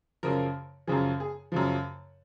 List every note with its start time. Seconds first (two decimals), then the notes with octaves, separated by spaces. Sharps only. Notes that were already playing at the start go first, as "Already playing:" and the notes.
0.23 F#2 C#3 F3 A#4
0.87 F#2 C#3 F3 G#4
1.20 G#4
1.52 F#2 C#3 F3